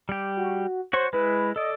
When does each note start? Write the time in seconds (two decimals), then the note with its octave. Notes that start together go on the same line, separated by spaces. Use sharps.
0.09 G3 G4
0.37 F#4
0.93 F#4 C5 C#5 C#6
1.13 G#3 E4 B4
1.56 A4 D5 D#5